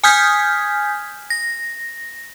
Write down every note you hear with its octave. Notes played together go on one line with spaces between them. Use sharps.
G#5 D#6 F6 G6 G#6 B6
A#6